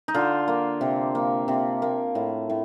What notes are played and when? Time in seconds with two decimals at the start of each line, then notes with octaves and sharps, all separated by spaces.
0.08 D#4
0.14 D3 F4
0.48 A#3
0.81 C3
1.15 A#3
1.48 C3
1.82 A#3
2.15 A2
2.50 A2